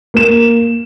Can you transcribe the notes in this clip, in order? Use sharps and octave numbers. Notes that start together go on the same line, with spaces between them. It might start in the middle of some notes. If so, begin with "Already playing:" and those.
A#3 E7